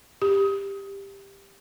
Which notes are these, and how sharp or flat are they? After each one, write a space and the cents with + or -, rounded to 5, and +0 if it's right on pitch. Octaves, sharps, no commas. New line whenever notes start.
G4 +10